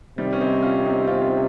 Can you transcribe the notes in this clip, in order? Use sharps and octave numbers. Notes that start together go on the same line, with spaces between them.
C3 D#3 G3
C#4
C4 D#4
C#4 F4
C4 D#4
C#4 F4